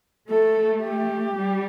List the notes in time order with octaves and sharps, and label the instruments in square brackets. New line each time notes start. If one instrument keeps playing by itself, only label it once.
[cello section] A3 [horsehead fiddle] A4
[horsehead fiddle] G4
[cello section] G3